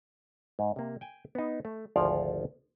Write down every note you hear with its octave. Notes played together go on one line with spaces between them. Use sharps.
G#2
C3 A#3
G5 G#5
B3 D#4
A3
G#1 D2 F3 C#5 D5 F5